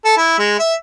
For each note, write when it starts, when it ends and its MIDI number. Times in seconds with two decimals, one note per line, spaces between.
0.05 0.15 69
0.17 0.36 64
0.38 0.55 56
0.59 0.74 76